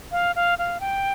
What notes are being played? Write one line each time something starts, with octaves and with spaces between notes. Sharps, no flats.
F5
F5
F5
G5